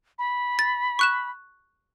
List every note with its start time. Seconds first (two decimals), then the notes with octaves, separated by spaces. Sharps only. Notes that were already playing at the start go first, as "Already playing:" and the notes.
0.19 B5
0.59 A6
0.99 C#6 F#6 E7